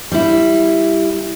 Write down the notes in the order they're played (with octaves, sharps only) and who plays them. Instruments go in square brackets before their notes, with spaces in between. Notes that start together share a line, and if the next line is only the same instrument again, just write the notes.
[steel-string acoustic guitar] G3 E4